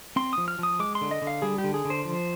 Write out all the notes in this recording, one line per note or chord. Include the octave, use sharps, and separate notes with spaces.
C4 C6
F3 D#6
F6
F3 D#6
G#3 D6
C6
D3
D#5
D3
F5
G3 G#4
G4
D3
G#4
D3
C5
F3